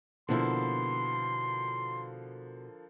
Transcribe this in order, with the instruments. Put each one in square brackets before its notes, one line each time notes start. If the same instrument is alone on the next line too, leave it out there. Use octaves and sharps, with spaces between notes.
[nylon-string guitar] B2 E4 [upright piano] D3 F3 A#3 [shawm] C6